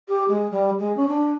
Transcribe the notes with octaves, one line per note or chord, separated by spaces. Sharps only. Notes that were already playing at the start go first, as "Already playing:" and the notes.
G4
G#3
G3
G#3
C#4
D4